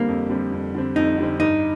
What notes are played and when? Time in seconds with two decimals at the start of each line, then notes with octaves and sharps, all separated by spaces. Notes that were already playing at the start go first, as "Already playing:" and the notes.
Already playing: D3 G3 A#3 C4
0.08 F2
0.29 D3 G3 C4
0.52 F2
0.75 D3 G3 C4
0.96 F2 D#4
1.18 D3 G3 C4
1.40 G2 D#4